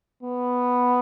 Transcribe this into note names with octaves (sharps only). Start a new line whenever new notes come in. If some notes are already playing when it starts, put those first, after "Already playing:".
B3